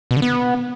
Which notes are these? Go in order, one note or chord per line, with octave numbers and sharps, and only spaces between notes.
B2
D3
B3